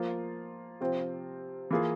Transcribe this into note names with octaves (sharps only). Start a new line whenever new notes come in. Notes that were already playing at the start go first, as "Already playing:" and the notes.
Already playing: F3 A#3 F4
C3 F3 C4 F4
E3 A#3 F4 G#4